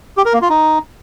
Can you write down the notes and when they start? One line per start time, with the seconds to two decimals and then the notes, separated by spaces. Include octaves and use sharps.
0.17 G4
0.25 A#4
0.34 A#3
0.42 F4
0.50 D#4